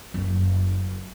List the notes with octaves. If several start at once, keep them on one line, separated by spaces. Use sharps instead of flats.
F#1